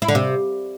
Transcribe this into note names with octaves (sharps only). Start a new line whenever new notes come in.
E4
D3
C3